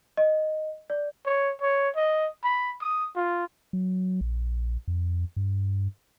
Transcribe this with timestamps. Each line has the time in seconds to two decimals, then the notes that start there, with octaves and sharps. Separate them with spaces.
0.17 D#5
0.90 D5
1.26 C#5
1.61 C#5
1.96 D#5
2.44 B5
2.81 D#6
3.16 F4
3.73 F#3
4.21 A#1
4.88 F2
5.36 G2